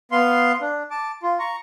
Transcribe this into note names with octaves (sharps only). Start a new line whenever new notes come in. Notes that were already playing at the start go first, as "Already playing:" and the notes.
B3 F5 C6
D4
A5 D6
F4
A#5 C#6